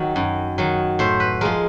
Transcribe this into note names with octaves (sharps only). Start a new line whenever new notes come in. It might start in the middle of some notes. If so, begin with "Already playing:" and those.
Already playing: D#3 F#3
F#2
D#3 F#3
A2 C5
B4
F3 G#3 A#4